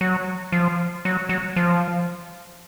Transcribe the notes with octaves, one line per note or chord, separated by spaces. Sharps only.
F#3
F3
F#3
F#3
F3